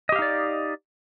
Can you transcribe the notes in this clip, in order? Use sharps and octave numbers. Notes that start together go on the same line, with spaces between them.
D#4 G4 D5 D#5 F5